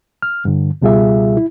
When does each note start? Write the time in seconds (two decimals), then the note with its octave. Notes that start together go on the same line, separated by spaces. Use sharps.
0.22 F6
0.45 G2 D3
0.82 C#2 B2 G3 F4 G#4 E5
1.37 E4